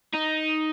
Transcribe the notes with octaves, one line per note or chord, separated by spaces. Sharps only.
D#4